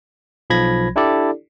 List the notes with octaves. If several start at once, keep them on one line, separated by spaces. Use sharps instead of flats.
B1 F3 B5 G#6 A#6
D4 E4 G4 A4 D5